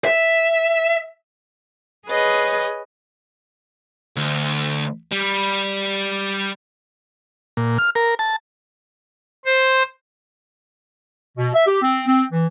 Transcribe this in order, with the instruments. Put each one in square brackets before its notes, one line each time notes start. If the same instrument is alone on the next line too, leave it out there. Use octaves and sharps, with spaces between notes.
[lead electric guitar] E5
[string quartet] G#4 B4 C#5 D#5
[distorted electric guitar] D2
G3
[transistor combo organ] A#2
F6
A#4
A5
[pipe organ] C5
[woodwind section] B2
E5
G4
C4
C4
E3